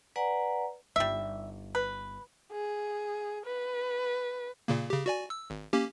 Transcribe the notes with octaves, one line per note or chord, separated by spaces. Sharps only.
B4 D5 F#5 G#5 A#5
G1 G3 D#4 E5
B4
G#4
B4
A#2 C#3 A#3
C#3 G4
F#4 D5 G#5
E6
G#1
A#3 C#4 G4